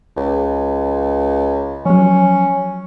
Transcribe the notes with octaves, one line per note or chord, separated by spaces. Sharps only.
C#2
F3 F#3 C#4